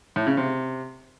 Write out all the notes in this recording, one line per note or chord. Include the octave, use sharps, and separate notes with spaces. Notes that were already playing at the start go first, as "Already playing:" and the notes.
A2
C#3
C3